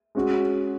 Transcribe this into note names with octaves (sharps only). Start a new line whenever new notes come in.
G#3 C#4 F#4